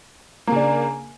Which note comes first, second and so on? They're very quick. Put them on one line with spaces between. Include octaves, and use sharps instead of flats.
A#3 C#3 D4